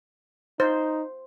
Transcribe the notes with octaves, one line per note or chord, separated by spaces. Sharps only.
D#4 C5